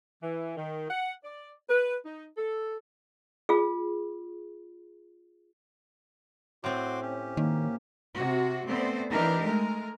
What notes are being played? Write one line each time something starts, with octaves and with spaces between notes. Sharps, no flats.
E3
D#3
F#5
D5
B4
D#4
A4
F4 G#4
A2 C4 F#4 C6 D6
C#4 G4
D#3 A#3
C3 F#4
A3 B3 C4 C5 D5
E3 D4 D#4 G4 A#4
G#3 A3 A#4